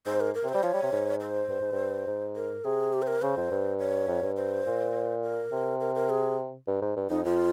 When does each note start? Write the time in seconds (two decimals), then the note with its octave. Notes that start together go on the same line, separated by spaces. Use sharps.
0.06 G#2 C5
0.20 A#4
0.35 A#4
0.44 C3
0.49 C5
0.54 G3
0.63 F3 C#5
0.73 G3
0.83 C3
0.92 G#2
1.21 C5
1.49 G2
1.61 G#2
1.72 G2
2.07 G#2
2.36 A#4
2.64 C3 G#4
2.93 G4
3.02 C5
3.07 A#4
3.22 C#3 C5
3.37 F2
3.51 G2
3.79 C#5
4.08 F2
4.22 G2
4.37 C5
4.66 A#2
5.23 A#4
5.52 C3
5.80 A#4
5.95 A#4
6.10 G#4
6.67 G2
6.81 G#2
6.96 G2
7.10 F2 D#4
7.25 F2 F4